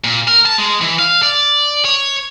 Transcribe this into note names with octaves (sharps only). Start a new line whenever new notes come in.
A#2
A#4
A5
G#3
E3
F5
D5
C#5